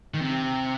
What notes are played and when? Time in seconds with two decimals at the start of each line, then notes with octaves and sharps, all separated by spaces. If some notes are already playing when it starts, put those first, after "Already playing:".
0.14 D#3
0.21 C3